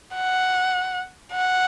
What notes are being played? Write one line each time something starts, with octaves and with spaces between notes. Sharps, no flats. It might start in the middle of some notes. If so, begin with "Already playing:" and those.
F#5
F#5